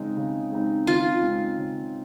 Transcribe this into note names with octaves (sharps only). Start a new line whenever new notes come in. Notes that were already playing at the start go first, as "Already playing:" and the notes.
Already playing: C#3 G#3 C4 D#4
C#3
G#3 C4 D#4
C#3 F4
G#3 C4 D#4
C#3